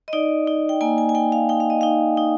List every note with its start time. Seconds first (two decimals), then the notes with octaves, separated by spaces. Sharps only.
0.08 D#5
0.13 D#4 D5
0.47 D#4
0.69 G5
0.81 A#3 G#5
0.98 G#5
1.09 G#5
1.15 A#3 G5
1.32 F5
1.49 D#4 G5
1.60 F5
1.70 D#5
1.81 D#4 F5
2.17 D#4